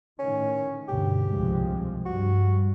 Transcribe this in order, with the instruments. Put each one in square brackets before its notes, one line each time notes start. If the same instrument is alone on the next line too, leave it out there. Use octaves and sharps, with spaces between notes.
[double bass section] A2 D#3 [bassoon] C#4
[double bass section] D2 G2 B2 [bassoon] G4
[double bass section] C2 F3 G#3
[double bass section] G2 G3 [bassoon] F#4